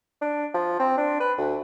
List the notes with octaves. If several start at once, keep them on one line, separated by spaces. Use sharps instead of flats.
D4
F3
C4
D4
B4
D2